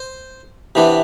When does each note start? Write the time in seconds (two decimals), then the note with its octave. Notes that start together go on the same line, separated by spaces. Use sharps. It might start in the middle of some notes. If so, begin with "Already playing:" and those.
Already playing: C5
0.75 C3 E3 B3 D4